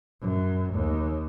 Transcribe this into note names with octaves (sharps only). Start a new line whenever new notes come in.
F#2
D#2